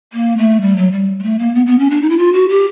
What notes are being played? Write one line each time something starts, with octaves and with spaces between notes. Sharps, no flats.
A#3
A3
G3
F#3
G3
G#3
A3
A#3
B3
B3
C#4
D4
D#4
E4
F4
F#4
G4